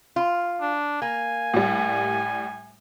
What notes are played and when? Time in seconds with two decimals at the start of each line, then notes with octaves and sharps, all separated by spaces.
0.16 F4
0.61 D4
1.02 A#3 G#5
1.54 A2 G3